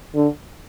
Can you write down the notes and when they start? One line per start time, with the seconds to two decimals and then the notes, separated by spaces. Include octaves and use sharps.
0.15 D3